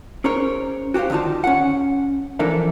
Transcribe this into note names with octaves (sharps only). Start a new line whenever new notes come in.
C#4 G#4 A#4 C5 C#5
F#4 G4 A4 C5 F5
D3 D#3 D#4 F4 A5
C#4 F#5
E3 F3 D4 A4 A#4 E5